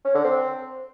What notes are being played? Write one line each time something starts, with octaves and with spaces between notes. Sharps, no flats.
C#4
D3
C4